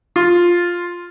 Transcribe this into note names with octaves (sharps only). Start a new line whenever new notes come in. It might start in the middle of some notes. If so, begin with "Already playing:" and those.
F4